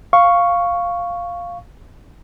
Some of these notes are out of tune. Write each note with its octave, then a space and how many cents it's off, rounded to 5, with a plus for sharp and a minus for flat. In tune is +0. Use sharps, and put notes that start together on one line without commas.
F5 +0 C#6 +0